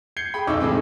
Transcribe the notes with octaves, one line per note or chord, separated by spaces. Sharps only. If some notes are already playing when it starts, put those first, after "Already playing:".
G6 G#6 C7 C#7 G7
G#4 G5 B5
B1 F2 D#4 C#6 D6 E6
A2 C3 D#3 E3 G#3